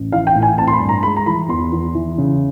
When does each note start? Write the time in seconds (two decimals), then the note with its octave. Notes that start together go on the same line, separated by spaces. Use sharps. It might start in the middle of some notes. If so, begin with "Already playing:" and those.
Already playing: A1
0.12 E3 F5
0.27 G5
0.35 A2
0.42 G#5
0.58 C4 A5
0.68 C6
0.73 B5
0.80 G2
0.89 A#5
1.03 G#3 B5
1.17 A#5
1.26 E3 B5
1.48 E2 C6
1.73 E2
1.95 E3
2.18 C#3